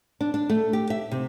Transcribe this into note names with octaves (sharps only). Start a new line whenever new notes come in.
D4
D4
A3
G4
E5
C3